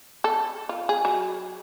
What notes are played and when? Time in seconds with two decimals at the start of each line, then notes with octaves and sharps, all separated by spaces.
0.24 A4
0.69 F4
0.89 G#4
1.05 F#3